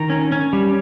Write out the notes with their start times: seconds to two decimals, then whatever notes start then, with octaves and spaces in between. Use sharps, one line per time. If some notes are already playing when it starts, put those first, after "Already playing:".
Already playing: D#3 A#5
0.10 C#4
0.32 C#4
0.53 G3